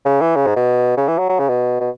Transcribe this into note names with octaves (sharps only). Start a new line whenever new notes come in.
C#3
E3
C#3
G#2
B2
C#3
E3
F#3
F#3
C#3
B2
B2